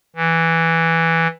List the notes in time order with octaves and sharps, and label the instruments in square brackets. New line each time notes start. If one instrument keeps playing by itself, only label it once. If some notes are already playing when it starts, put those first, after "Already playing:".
[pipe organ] E3